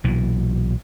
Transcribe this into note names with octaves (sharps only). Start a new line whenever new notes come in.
B1 A#2 E3 F#3